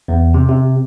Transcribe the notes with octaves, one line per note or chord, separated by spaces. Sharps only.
E2
C3
C3